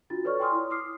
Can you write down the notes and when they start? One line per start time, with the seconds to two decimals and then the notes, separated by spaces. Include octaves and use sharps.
0.10 D4 F4 F#4 A6
0.24 A4 B4 C#5 D5 C#6 F6
0.40 G5 G#5 C6 D#6 F6
0.52 E4 C#5
0.70 D6 D#6 F6 C7